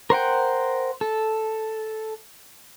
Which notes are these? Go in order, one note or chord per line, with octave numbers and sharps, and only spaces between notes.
A#4 C5 F#5 G5
A4